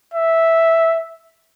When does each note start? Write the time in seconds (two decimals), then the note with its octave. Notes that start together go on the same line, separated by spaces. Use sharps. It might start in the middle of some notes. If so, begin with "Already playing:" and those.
0.14 E5